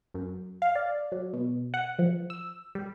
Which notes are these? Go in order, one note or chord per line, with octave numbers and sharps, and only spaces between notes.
F#2
F5
D5
F#3
B2
F#5
F3
E6
G3